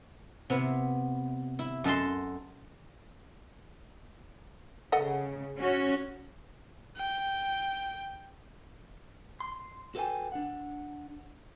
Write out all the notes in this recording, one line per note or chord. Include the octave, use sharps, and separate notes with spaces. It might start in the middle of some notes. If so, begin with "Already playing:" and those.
C3 B3 E4
E4
F#2 A4 D#5 A5 C6
C#3 A4 D#5 F#5
C#4 F#4
G5
C6
F#4 A4 B4 D#5 G5 G#5
D4 F#5